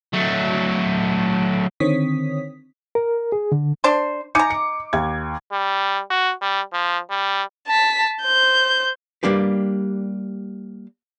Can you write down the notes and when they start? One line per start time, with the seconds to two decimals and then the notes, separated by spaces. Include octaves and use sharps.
0.13 F#3 A3
1.80 D3 D#3 C4 C#5 D#6 B6
2.95 A#4
3.32 G#4
3.52 D3
3.84 D4 C5
4.35 D#4 G#5 A#5 D6 C#7
4.50 C#7
4.93 D#2 G#6
5.52 G3
6.11 F#4
6.42 G3
6.73 F3
7.10 G3
7.67 A5 B6
8.22 C5 G6
9.23 G3 A#3 D4 G4 B4